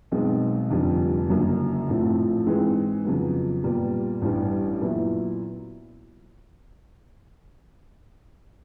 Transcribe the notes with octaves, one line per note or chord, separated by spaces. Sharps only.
B1 B2 G#3 C4 D#4
F1 F2 D3 G3
F#1 F#2 D3 F#3 A#3
A#1 A2 F3 A3 C4
G#2 E3 G#3 C4
F2 C#3 F#3 B3
A#2 G3 B3
A1 G2 E3 G3
A#2 F#3 B3 E4